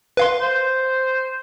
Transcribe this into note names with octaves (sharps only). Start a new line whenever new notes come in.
B4 F5 C6
C5